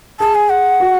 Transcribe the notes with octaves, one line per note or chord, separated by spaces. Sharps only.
G#4 A5
G#5
F#5
F#4